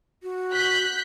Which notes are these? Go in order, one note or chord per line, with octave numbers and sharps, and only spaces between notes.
F#4
F#6 G6 B6